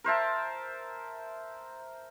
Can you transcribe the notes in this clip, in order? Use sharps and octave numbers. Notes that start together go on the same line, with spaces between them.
A#4 C5 E5 A5